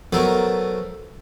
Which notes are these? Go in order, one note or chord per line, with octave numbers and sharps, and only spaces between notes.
F#3 A3 B3 A4 A#4 C5